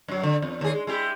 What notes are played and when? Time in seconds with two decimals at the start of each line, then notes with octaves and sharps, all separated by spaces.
0.08 F#2 F#3
0.23 D3
0.42 E2
0.61 D#2 G#4
0.73 G#3
0.87 G#3 E4 G4